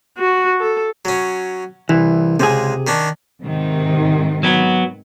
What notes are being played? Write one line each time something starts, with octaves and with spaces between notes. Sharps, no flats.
F#4
A4
F#3 C#4
C2 E3
C#2 C3 G#3 G#4
D#3 C#4 D4
G#2 C3 D#3
F#3 B3